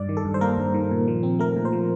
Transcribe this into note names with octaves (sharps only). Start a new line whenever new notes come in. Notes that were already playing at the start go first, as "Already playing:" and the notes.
Already playing: G2 D5
D#3
A4
G2
C5
A#3 A#4
G2
D#3
A#2
F3
C4
A3 A#4
A#2
C5
F3